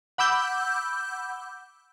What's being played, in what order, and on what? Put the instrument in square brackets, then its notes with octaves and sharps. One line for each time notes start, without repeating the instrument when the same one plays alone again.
[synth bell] F#5 B5 D6 E6 G6